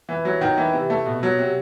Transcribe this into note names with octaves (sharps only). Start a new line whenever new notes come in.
E3
F#3
D#3
E3
C3
A3
B2
F#3
C3